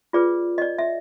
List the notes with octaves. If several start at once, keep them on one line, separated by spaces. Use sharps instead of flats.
F4 G#4 B4 D5
D#5
D5
E5